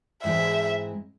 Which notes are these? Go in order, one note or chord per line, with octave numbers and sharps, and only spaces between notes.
G#2 E3 G#3 C4 E4 E5